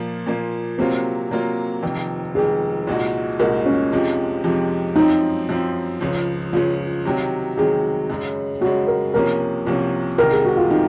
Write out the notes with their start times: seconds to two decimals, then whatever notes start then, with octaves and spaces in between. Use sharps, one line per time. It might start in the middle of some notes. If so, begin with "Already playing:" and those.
Already playing: A#2 F3 A#3
0.26 A#2 F3 A#3
0.78 C3 F#3 A#3 C4 F4
1.31 C3 F#3 A#3 F4
1.83 F1 F2 D#3
2.35 F1 F2 D#3 G#4
2.87 C2 A#2 G#3 D#4 F#4
3.39 C2 A#2 G#3 D#4 F#4 A#4
3.66 C#4
3.92 F2 C3 F3 G#3 D#4
4.44 F2 C3 F3 G#3 D#4
4.96 F#2 F3 C4 D#4
5.49 F#2 F3 C4
6.01 C#2 C#3 F3
6.53 C#2 C#3 F3 F4
7.05 C3 D#3 F#3
7.57 C3 D#3 F#3 G#4
8.10 F#2 C#3 G#3
8.61 F#2 C#3 G#3 F#4
8.87 A#4
9.14 C2 C3 F3 A#3 C#4 A#4
9.67 C2 C3 F3 A#3 C#4
10.18 C2 C3 D#3 A#4
10.31 G#4
10.45 F#4
10.57 F4
10.70 C3 D#3 D#4